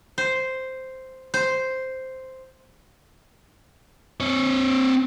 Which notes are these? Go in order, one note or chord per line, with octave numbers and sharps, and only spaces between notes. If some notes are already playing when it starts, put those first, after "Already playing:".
C5
C5
C4 C#5